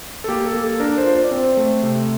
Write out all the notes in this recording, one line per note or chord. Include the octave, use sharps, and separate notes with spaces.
A4
A#3 G4
A4
A#3
A4
D4 A#4
C5
F4
C5
D5
C4 C5
A3
C3